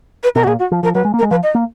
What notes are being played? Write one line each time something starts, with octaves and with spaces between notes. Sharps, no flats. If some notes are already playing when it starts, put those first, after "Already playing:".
B4
B2 A#4
F#4
A#2 G#4
F#4
F3
F3 A#4
F#3 B4
G#3
A#3
A#4
G#3
F3 B4
D#5
A#3